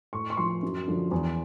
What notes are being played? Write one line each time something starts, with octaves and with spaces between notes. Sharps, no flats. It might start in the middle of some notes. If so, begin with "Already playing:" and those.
A2 C#6
C#6
F3 C6
F#2
D3 F3
E2